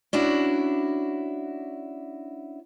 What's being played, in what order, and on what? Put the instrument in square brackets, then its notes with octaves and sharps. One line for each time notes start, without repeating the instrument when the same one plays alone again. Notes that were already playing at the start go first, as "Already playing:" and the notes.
[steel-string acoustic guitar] C#4 D4 E4 F#4